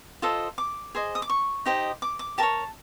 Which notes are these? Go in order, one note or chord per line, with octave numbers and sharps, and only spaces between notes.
F4 A4 C5 D#5
D6
G#4 C5 D#5
D#6
D6
C#6
D#4 G4 C5 D#5
D6
D6
G4 A#4 C#5 A5